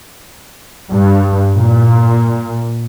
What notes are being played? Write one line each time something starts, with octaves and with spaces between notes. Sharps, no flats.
G2
A#2